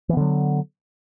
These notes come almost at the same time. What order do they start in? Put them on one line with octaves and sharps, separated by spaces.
E3 B3 D3 F#3